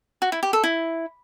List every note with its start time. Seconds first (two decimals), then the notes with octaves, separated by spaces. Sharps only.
0.22 F#4
0.32 E4
0.43 G4
0.53 A4
0.64 E4